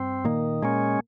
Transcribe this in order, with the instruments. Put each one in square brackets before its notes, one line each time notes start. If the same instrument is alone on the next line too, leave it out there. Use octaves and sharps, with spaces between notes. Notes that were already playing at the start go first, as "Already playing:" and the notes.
Already playing: [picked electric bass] G2 [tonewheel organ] C4
[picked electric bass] A#2 A#3 [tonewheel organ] D#3
[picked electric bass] A#2 A#3 [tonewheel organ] G#3 C#4